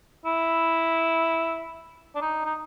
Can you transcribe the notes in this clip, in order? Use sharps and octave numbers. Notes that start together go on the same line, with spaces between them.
E4
D4
D#4
D#4